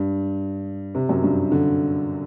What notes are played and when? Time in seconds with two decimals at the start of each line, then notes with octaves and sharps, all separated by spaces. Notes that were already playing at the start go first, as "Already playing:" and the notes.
Already playing: G2
0.95 C3
1.09 F#2
1.23 G2
1.52 D3